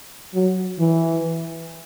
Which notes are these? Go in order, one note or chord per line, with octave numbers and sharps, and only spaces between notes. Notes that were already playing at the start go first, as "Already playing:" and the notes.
F#3
E3